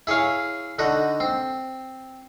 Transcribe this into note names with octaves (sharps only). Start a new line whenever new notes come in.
E4 G#4 C#5 F5
D3 D#4 F#4
C4